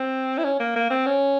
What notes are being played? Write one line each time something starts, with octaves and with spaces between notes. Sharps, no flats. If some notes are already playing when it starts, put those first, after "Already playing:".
Already playing: C4
E4
C#4
A#3
A#3
C4
C#4